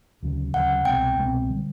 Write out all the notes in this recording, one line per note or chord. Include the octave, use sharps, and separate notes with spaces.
D2 C#3 F#3
D2 C#3 F#3 F#5
C2 B2 G#3 C4 G5
C2 B2 G#3 C4
D3 G3